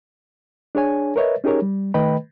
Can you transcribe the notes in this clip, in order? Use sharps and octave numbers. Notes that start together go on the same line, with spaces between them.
D4 G#4 C#5 G#5
A#4 B4 C#5 D#5 E5
C#4 D#4 G4 G#4 A#4 C#5
G3
D#3 A3 B4 D#5 G5 B5